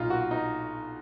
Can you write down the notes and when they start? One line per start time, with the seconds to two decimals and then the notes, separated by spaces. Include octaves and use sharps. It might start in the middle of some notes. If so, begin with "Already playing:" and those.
Already playing: B1 A#2 D#4 F4
0.10 F#4
0.31 D#4